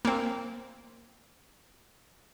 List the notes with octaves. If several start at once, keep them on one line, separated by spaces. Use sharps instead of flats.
A#3 C4